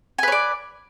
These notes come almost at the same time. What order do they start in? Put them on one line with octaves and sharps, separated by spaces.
G#5 B4 C#5 D5